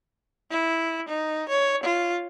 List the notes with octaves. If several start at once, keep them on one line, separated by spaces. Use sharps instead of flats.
E4
D#4
C#5
F4